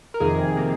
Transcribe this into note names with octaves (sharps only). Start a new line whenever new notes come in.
A#4
F2 C3 D#3 A#3 G#4
C3 D#3 A#3